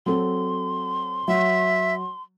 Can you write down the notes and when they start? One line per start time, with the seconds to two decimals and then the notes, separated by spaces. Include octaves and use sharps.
0.06 F#3 C4 A4 C6
1.28 F#3 E5